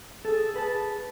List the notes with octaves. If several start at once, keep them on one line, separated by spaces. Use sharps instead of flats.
G#4 A4
G#4 B4 G#5 A5